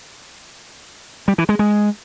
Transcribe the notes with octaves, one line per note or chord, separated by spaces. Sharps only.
G3
E3
G#3
G#3